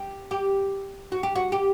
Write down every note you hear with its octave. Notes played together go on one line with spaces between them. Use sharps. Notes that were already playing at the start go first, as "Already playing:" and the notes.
Already playing: G4
G4
F#4
G4
F#4
G4